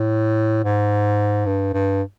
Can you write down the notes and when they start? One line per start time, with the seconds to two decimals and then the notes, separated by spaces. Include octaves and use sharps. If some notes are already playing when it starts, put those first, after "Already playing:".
Already playing: A2
0.64 G#2
1.46 G2
1.73 G2